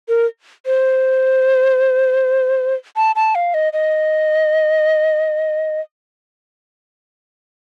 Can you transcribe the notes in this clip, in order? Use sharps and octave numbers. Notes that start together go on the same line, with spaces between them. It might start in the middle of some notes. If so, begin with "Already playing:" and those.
A#4
C5
A5
A5
F5
D#5
D#5